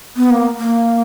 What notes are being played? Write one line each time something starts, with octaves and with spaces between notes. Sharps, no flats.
B3
A#3
A#3